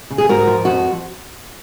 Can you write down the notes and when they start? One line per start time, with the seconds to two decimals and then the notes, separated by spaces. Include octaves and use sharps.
0.10 C#3
0.18 G#4
0.29 G#2 F#4 A#4
0.47 F3
0.65 F2 F#4